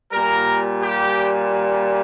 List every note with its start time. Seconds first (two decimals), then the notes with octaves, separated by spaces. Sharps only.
0.12 A#2 G3 A#4
0.81 G4